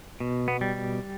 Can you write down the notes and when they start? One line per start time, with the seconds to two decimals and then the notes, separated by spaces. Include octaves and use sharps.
0.20 B2
0.48 B3
0.61 G3